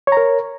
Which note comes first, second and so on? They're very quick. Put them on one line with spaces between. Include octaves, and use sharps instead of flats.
C#5 A#5 A#4